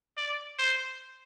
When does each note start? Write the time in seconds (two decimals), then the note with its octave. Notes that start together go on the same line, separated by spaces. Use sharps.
0.18 D5
0.59 C5